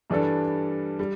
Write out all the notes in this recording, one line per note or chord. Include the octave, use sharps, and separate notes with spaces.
G2 E3 G3 D4 A4
G3